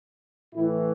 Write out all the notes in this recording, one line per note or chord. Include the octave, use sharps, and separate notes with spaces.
A2 E3 E4